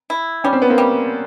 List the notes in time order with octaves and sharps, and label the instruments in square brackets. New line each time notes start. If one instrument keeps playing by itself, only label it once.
[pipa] E4
[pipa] G3 [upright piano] C#4
[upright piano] C4
B3
A#3 C4
[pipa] G3